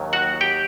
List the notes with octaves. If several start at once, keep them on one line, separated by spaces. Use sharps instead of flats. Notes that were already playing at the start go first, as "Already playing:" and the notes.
Already playing: D#2 D#3 F#3
F#4 F#5
G4 G5